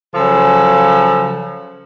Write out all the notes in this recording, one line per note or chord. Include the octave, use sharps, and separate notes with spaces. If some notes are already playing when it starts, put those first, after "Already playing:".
C#3 F3 F#3 A4